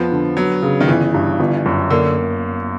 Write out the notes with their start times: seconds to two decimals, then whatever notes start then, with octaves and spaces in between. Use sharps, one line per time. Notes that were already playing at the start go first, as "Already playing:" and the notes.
Already playing: F2 F3 B3
0.12 D3
0.37 F#3 B3
0.62 C#3
0.81 D#3
0.88 G1 E3
1.14 G2
1.40 G1
1.66 F#2
1.91 D3 A#3